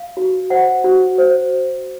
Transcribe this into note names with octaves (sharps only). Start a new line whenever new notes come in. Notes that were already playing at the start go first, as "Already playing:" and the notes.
Already playing: F5
F#4
C5 F#5
F#4
C5